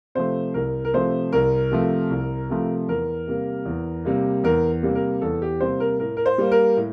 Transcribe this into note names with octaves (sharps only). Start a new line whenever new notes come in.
C3 F3 A3 C5
C2 A#4
A#4
C3 F3 A3 C5
C2 A#4
C3 F3 A3
C2
C3 F3 A3
E2 A#4
C3 G3 A#3
E2
C3 G3 A#3
E2 A#4
C3 G3 A#3
A#4
E2 A4
G4
C3 G3 A#3 C5
A#4
A2 A#4
A#4
C5
G3 A#3
A#4
A2